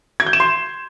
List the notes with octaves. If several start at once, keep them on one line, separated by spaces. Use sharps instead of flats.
G#6
G6
E7
C6